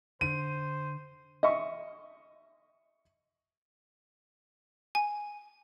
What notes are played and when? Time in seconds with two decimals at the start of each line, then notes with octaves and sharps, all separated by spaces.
0.21 D3 C5 D#7
1.43 D#5 E5 C#6
4.95 G#5